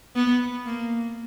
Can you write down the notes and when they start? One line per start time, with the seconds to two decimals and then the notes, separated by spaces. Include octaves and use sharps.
0.15 B3
0.66 A#3